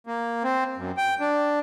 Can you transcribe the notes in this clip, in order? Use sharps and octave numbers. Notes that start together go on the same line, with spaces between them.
A#3
C4
F#2
G5
D4